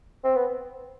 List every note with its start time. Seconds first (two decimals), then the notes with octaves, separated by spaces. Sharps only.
0.24 C4
0.36 B3